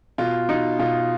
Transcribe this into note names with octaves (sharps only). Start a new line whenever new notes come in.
B2 F4
B2 D#4
B2 F4